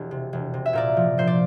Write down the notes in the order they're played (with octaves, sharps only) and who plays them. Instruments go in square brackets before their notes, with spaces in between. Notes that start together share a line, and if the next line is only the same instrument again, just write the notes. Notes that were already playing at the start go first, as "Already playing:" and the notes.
Already playing: [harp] E1 G4
C3
E1
C3
E5
A#2 A#4 D5
F3
A#2 C5
D5